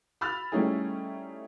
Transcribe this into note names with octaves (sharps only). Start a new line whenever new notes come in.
B5 E6 F6 A6 F7
G3 A3 C#4 D#4 E4 G#4